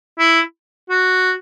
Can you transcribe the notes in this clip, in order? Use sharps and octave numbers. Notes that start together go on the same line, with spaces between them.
E4
F#4